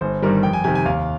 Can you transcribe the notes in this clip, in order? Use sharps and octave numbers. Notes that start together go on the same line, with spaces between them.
G1 C5
G2 D#3 G3 A#4
F2 G5
G#5
C3 D#3 G#5
G#5
D#2 F5